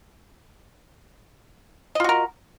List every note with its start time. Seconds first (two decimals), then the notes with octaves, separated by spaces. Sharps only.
1.95 D#5
2.00 F4
2.04 F#4
2.09 A#4